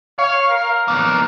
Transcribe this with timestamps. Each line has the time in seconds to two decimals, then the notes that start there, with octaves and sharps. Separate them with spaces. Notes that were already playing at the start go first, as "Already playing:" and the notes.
0.19 C#5 F5
0.51 A#4
0.88 A#3 B3